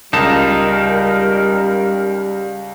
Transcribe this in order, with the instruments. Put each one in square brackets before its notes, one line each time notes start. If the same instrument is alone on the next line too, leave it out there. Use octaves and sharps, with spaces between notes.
[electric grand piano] C#2 A5 E7 [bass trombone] G3 [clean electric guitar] D#4 [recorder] A#4